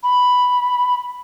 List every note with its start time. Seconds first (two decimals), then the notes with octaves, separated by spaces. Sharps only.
0.04 B5